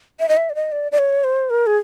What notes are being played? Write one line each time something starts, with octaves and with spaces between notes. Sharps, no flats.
E5
D#5
E5
D5
D#5
D5
D5
C#5
C5
A#4
G#4